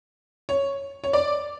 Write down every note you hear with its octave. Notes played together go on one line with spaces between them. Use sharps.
C#5
C#5
D5